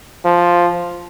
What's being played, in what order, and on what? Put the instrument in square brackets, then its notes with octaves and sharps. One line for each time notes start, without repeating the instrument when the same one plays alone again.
[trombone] F3